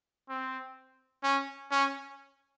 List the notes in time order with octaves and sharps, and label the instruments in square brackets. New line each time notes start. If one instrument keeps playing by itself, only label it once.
[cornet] C4
C#4
C#4